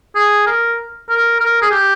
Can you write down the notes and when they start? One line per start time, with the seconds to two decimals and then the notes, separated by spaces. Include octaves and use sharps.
0.15 G#4
0.47 A#4
1.10 A#4
1.40 A#4
1.62 G#4
1.71 G4